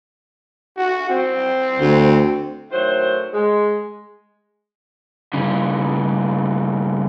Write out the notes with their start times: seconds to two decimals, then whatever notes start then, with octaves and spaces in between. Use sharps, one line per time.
0.77 F#4
1.10 C4
1.79 D2
2.70 A2 D#3 F#3 C5
3.33 G#3
5.34 G2 C#3